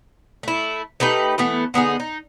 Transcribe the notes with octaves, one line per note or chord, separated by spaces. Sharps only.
A3 E4
A3 D#4 G4 B4
E3 A3 B3
D3 B3 D#4 G#4
D#4